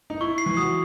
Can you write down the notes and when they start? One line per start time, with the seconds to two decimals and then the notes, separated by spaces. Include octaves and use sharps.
0.10 D#4
0.21 E4 C#6
0.38 C7
0.46 E3
0.57 F#3 D#6